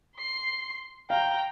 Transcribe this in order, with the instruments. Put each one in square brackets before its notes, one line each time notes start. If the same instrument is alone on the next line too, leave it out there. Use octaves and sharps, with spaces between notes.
[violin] C6 C7
[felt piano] F5 [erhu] G5 [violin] A#5